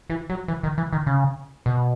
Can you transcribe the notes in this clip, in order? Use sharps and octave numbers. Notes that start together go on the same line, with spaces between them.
E3
F#3
E3
D#3
E3
D#3
C#3
B2